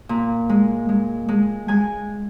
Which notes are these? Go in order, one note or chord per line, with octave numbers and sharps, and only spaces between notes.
A#2
G#3
G#3
G#3
G#3 G#5